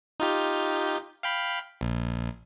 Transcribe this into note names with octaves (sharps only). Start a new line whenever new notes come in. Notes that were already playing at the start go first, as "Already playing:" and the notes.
D#4 F4 G4
F5 G5 B5
A#1